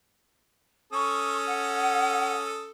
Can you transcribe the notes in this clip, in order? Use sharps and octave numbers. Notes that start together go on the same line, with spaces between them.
C#4 A4 C#6 D#6
F#5